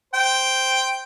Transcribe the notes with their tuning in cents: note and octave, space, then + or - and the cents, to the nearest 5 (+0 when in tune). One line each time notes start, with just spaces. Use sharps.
C5 +0 G5 +0